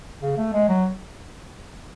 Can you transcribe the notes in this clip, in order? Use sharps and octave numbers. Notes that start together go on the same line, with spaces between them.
C#3
A3
G#3
F#3